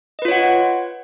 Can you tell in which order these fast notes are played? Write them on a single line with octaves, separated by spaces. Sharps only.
D#5 B4 F4 C#5 F#5